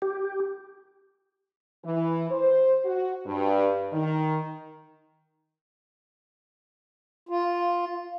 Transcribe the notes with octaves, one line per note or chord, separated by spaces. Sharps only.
G4
E3
C5
F#4
G2
D#3
F4